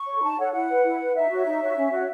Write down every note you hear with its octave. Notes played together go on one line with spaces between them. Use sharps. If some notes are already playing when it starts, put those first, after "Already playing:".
Already playing: C#6
A4 C#5
B5
D#4 A5
A4 C#5 F#5
E4 F#5
B4
E4
B4
D#4 E5
F#4 C#5
D#4
F#4 C#5
C#4
F#4 C#5